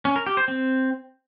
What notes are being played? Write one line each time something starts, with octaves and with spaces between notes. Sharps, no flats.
C#4
A#4
G4
C5
C4